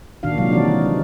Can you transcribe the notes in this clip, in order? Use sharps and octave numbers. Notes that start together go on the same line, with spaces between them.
A#2 D#3 D4 F#4 F5
C3 F3 F#3 G#3 F5
E3 G3 D4 D#4 F#4 D5
D#3
G#3